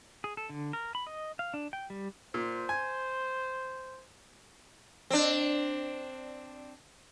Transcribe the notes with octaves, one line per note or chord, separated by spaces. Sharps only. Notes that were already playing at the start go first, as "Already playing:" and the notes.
G#4
A4
D3
A#4
B5
D#5
F5
D4
G5
G3
A#2 C5
G#5
C4 D4